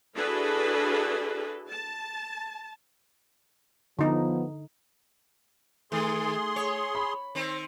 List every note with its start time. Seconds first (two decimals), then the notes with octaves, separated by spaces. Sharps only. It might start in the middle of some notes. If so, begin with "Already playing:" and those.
0.14 D4 E4 F#4 G#4 A4 B4
1.70 A5
3.99 D3 F3 B3 D#4
5.92 D#3 A3 G#4 C6
6.56 C#5
6.95 B5
7.35 D#3 C4